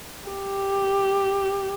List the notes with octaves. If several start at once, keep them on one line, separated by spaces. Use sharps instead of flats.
G4